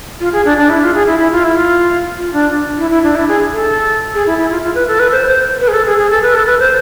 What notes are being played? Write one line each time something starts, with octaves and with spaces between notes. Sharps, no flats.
F4
G#4
D4
D4
E4
F4
G#4
E4
E4
F4
E4
F4
F4
D4
E4
E4
D4
E4
G#4
A4
G#4
E4
E4
F4
F4
B4
A4
B4
C5
C5
B4
G#4
A4
G#4
G#4
A4
B4
A4
B4
C5